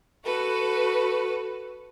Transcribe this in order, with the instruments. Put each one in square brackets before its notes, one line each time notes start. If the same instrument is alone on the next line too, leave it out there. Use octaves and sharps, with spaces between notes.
[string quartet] F#4 A4 B4